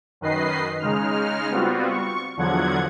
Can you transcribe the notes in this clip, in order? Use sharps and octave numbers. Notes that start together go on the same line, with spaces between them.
F#2 D#3 B4 D#5 C7
C#3 G#3 D#4 F6
G3 B3 C4 F4 F#4
C#6
E2 D3 F3 F#3 F#5 G#6